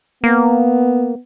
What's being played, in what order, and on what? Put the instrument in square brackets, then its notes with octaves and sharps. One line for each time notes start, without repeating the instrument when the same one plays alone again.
[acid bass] A#3 [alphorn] B3